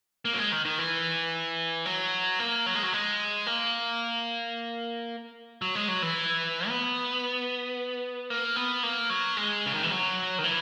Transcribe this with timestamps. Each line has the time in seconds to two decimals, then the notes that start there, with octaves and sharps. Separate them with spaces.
0.25 A#3
0.33 F#3
0.38 G#3
0.52 D#3
0.65 D#3
0.79 E3
1.86 F#3
2.40 A#3
2.66 F#3
2.75 G#3
2.83 F#3
2.93 G#3
3.47 A#3
5.62 F#3
5.75 G#3
5.88 F#3
6.02 E3
6.68 B3
8.30 A#3
8.56 B3
8.83 A#3
9.10 F#3
9.37 G#3
9.66 C#3
9.74 D#3
9.83 E3
9.90 F#3
10.38 D#3
10.44 E3